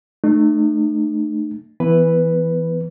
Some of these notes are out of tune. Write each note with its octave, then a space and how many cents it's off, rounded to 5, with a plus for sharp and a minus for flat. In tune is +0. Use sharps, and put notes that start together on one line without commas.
A3 +0 D#4 -45
E3 +0 B3 +15 B4 +0